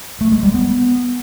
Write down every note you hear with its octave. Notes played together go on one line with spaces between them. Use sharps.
A3
G#3
G3
B3